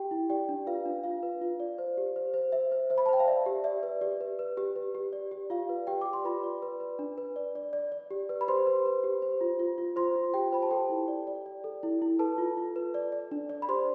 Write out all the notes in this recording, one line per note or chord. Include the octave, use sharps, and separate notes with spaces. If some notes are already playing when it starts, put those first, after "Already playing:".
Already playing: G4 G5
E4
G4 D5 G5
D4
F4 B4 F5
D4
F4 F5
B4
F4
D5
C5
G4
C5
C5
C5 E5
C5
C5 E5
B5
A5
C5 G5
F5
D5 E5
G4
D5 E5
B4
G4 D5
B4
B4
G4
B4
G4
D5
G4
F4 D5 F5
B4
G4 D5 G5
G4 D6
C6
F4 B4 B5
D5
B4
B4
D4
B4
D5
D5
D5
D5
G4
B4
B5
G4 C5 C6
B4
B4
G4
C5
F4
F4
F4
F4 C5 C6
F4
F4 G4 G5
C5 B5
A5
G4 A4 G5
E4
D5
D5
D5
A4
E4
E4
A4 B4 A5
F4
F4
B4
D5
D5
D4
D5
B5
G4 C5 C6